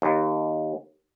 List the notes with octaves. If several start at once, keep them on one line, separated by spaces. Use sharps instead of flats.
D#2